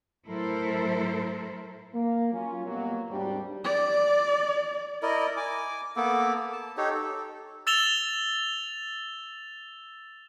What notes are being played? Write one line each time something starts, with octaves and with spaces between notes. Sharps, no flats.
A2 F#3 E4 A4 A#4 C5
A#3
F#3 C#4 F4
B2 F#3 G3 A#3
G#1 D#2 G3 D4
D5
E4 A#4 D5 D#5
G#5 D6
A#3 B3 A4 D6
A5
D#4 G4 A4 C#5
A4
E6 A6 E7 F7 G7